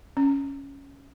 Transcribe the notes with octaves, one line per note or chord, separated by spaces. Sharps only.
C#4